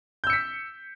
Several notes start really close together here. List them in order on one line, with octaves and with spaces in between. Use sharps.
G6 E6 C#7 B6